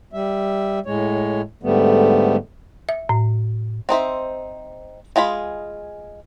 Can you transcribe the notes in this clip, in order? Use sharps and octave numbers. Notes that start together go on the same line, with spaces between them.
G3 E5
A2 G#3 C#5
G#2 D3 G3 A3 B3
E5
A2
C4 D#4 C5 E5
G#3 F4 G#4 B5